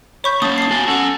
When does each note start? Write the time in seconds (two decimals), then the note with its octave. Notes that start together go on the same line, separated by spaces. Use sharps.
0.24 C#5 B5 C#6 G6
0.42 A#3 C#4 A5 D#6
0.58 D#6 C7
0.71 B3 F#4 G#5 A5
0.88 C#4 A4 F#5 G#5